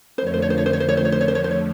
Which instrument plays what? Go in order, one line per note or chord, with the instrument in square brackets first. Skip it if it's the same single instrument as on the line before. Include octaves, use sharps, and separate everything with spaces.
[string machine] F2 D3 F3 A3 [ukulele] C5
[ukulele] C#5
C5
C#5
C5
C#5
C5
C#5
C5
C#5
C5
C#5
C5
C#5
C5
C#5
C5
C#5